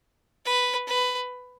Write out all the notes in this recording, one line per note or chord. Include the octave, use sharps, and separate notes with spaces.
B4
B4